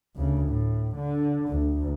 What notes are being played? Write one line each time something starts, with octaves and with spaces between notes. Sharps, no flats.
D2 C#3
A2
D3
D2